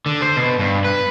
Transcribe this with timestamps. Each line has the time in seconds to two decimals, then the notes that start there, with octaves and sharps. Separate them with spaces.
0.06 D3
0.22 C5
0.36 B2
0.59 G2
0.84 B4